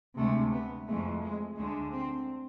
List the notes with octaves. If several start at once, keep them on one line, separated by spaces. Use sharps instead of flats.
D2 C3 G#3 A3
B3
F2 E3 G#3 A3
G#3
D2 D3 G#3 A3
C4